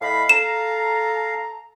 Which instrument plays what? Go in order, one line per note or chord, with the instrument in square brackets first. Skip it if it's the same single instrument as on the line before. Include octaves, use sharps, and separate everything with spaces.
[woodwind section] A2 D#5 B5 [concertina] F5
[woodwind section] A4 A#5 [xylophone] E7